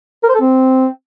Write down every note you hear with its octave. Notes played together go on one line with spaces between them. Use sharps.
A#4
C5
A4
C4